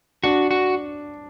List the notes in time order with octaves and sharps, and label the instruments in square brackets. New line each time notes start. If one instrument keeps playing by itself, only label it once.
[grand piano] D4 [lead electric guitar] F#4
[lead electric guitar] F#4